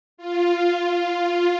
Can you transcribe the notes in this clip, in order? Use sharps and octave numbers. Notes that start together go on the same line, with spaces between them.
F4